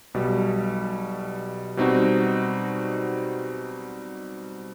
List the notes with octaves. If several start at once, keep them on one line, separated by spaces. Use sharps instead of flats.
B1 B2 G3
B2 G3 C4 D#4 F#4